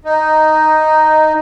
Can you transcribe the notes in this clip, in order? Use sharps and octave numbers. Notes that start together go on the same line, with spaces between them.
D#4